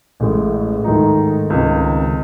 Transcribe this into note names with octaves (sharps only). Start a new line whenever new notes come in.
A1 A2 G#3
G#2 D#3 A3 D#4
C#2 C3 D#3